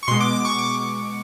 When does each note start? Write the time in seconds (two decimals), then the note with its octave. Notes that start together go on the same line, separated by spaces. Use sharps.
0.03 C#6
0.08 B2 G#3 C6
0.21 D6
0.33 D6
0.45 C#6
0.59 D6